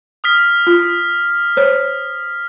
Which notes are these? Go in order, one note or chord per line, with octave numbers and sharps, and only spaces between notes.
D#6 F6 B6
F4
C5 C#5